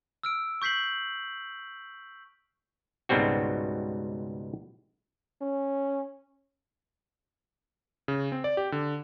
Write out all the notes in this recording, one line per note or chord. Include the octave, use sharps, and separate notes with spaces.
E6 F6 D7
C#6 G6 B6 C7 F#7
C#2 G#2 B2 G3 C4 F#4
C#4
C#3
C4
D5
G4
D3